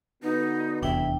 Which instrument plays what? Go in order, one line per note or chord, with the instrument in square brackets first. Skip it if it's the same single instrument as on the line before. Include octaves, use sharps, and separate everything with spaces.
[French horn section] D3 B3 F#4 [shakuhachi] D#4
[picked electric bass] F1 E2 [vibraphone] D4 G5 [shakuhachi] E5